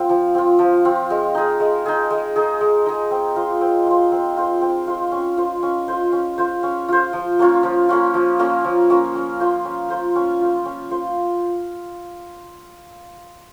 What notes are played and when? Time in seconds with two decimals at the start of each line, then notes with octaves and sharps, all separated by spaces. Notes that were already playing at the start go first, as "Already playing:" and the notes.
Already playing: C4 F4
0.09 F3
0.35 C4 F4
0.59 F3
0.85 C4 F4
1.10 G#3
1.35 D#4 G#4
1.60 G#3
1.86 D#4 G#4
2.10 G#3
2.36 D#4 G#4
2.61 G#3
2.86 D#4 G#4
3.11 C4
3.36 F4 C5
3.61 C4
3.87 F4 C5
4.12 C4
4.37 F4 C5
4.61 C4
4.87 F4 C5
5.12 C#4
5.37 F4 C5
5.63 C#4
5.88 F4 C5
6.12 C#4
6.38 F4 C5
6.63 C#4
6.88 F4 C5
7.13 F3
7.39 A#3 C#4 F4
7.63 F3
7.89 A#3 C#4 F4
8.14 F3
8.39 A#3 C#4 F4
8.64 F3
8.90 A#3 C#4 F4
9.15 C#4
9.40 F4 C5
9.65 C#4
9.90 F4 C5
10.16 C#4
10.40 F4 C5
10.65 C#4
10.90 F4 C5